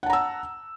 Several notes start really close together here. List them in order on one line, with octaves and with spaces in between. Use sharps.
F#5 A5 A#5 E6